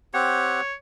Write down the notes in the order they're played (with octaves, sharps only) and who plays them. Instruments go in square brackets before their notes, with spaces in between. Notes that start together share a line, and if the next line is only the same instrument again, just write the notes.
[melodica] C4 G4 F#5 [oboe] C#5